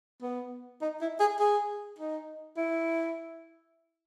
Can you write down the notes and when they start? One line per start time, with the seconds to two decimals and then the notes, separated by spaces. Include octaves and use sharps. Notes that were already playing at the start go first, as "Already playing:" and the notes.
0.22 B3
0.82 D#4
1.01 E4
1.20 G#4
1.40 G#4
1.99 D#4
2.57 E4